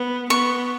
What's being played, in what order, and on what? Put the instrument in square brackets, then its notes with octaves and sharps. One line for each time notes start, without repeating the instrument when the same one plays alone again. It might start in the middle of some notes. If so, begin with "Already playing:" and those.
Already playing: [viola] B3
[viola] B3 [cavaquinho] C#6